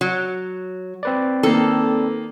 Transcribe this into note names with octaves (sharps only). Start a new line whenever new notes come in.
F#3
C4 B4 D5
D#3 A#3 A4